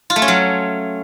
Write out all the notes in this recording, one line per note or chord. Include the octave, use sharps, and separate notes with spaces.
F4
A3
C#4
F#3